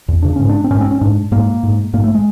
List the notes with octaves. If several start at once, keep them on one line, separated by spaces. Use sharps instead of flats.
E2
C#3 D4
G#2 C#4
D4
C4
G#2 C#4
C4
C#4
G#2 D4
G#2 A#3
G#2
G#2 A#3
A3
G#3